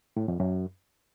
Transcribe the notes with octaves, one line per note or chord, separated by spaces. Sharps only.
A2
F2
F#2